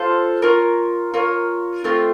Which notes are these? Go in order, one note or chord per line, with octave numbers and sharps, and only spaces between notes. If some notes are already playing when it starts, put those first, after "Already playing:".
Already playing: F4 A4 C5
F4 A#4 C#5
F4 A#4 C#5
A3 C4 F4